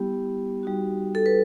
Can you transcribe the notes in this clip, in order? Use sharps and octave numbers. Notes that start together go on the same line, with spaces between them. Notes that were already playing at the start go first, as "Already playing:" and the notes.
Already playing: G3 B3 E4 G4
G3 D#4 F#4
A4
B4